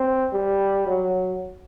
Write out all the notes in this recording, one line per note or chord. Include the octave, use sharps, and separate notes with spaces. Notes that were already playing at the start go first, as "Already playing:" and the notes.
Already playing: C4
G3
F#3